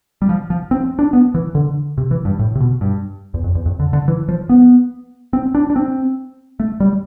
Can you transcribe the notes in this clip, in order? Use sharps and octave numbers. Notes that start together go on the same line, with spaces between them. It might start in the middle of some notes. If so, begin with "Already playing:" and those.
G3
F3
F3
C4
D4
B3
E3
D3
C3
E3
G2
A2
C3
B2
G2
E2
F2
E2
F2
D3
D3
E3
F3
B3
C4
D4
D4
C4
A3
G3